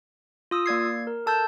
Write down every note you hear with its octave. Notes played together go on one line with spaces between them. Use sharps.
F4 D#6 E6
A#3 D5 G#6 C7
A#4
A4 A5 E6 G6